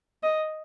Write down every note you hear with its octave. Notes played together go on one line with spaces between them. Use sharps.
D#5